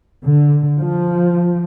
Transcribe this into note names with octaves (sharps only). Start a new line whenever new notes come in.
D3
F3